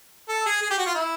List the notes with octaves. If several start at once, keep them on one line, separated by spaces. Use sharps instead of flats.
A4
G#4
G#4
G4
F#4
F4
E4